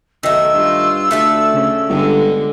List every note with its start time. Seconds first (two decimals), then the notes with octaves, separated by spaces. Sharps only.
0.23 B1 D#3 A3 E6
0.53 G2 F4
1.11 D2 A3 D4 A4
1.52 C#3
1.89 G1 D3 G#3